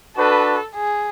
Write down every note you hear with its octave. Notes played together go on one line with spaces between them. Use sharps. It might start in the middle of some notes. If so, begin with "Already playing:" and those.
D4 F#4 A4 B4
G#4